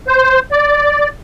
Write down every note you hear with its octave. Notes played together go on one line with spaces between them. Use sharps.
C5
D5